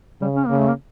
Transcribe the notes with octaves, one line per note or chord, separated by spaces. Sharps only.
C#3 G3
C#4
C#3 A#3
A3
A#3